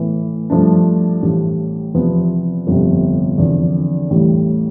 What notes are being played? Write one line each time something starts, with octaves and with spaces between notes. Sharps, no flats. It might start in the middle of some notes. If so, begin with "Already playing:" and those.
Already playing: A2 E3 B3
G2 F3 A3 D4
A1 A2 G3
E2 C3 F3 B3
G1 F2 C3
E2 D3 F3 C4
A1 A2 E3 G3